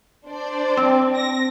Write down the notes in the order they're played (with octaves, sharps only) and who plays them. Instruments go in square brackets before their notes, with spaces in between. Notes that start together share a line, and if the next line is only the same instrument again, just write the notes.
[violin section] D4 C5 D5
[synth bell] C4
[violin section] A#6